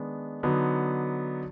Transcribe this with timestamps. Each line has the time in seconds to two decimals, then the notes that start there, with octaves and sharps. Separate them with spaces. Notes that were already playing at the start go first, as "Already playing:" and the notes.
Already playing: D#3 G#3 B3 D4
0.43 D3 F#3 B3 D#4